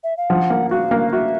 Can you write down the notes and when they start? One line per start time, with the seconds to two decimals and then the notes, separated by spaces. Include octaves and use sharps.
0.04 E5
0.17 F5
0.30 F3 F#5
0.50 A#3
0.71 F#4 F5
0.91 A#3
1.13 F#4 E5